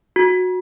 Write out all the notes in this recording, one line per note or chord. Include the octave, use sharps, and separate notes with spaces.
F#4